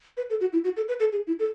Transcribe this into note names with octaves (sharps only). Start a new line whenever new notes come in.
B4
A4
F#4
E4
F#4
A4
B4
A4
G#4
E4
A4